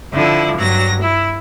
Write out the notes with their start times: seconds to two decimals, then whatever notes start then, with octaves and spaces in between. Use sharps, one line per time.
0.13 D3 F3 E4
0.57 G2 F#3 A#6
1.01 E4